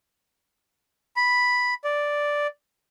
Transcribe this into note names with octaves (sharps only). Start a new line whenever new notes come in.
B5
D5